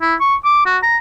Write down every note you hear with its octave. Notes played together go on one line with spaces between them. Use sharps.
E4
C#6
D6
F#4
A#5